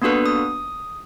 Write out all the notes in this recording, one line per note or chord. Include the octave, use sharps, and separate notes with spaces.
A#3 B3 D4 F#4 A4 B4
D#6